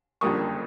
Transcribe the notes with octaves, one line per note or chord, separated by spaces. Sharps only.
F#1 F2 D3 G3 A#3 C#6 D#6